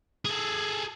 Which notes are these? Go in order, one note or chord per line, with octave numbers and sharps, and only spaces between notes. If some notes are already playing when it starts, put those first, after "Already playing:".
G#4 A4